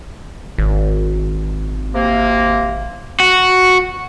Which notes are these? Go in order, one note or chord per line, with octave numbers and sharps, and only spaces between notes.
G#1
C3 A#3
F#4